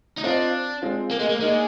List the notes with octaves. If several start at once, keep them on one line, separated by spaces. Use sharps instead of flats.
D#4
C4 D4 F4 C5 D#5
G#3 C4 F4
A#3
G#3
A#3
G#3 A#3 D#4 A#4 D5